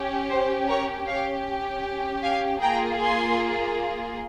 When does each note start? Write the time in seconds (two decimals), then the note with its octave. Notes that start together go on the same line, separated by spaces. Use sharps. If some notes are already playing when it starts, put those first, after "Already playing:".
Already playing: C#4 G4
0.30 C5
0.68 A#4 C#5
1.07 C#4 G4 C#5 F5
2.22 F5 G#5
2.61 A#3 F4 G#4 G5 A#5
2.99 G#5 C6